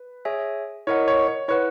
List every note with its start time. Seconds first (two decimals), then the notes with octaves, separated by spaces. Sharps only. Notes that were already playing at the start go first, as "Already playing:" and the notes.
Already playing: B4
0.25 G#4 C#5 E5 G#5
0.87 E4 A#4 C#5 D#5 F#5
1.08 C#5
1.28 C#5
1.48 E4 B4 C#5 F#5